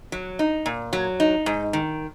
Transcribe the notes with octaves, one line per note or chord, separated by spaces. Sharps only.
F#3
D#4
A#2
F#3
D#4
G#2
D#3